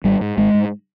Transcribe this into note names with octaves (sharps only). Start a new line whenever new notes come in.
G#1 G3
G#2
G#1 G#3
G#2